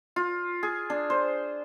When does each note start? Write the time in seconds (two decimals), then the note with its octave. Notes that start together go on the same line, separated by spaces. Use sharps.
0.16 F4
0.63 G#4
0.90 D4
1.10 C5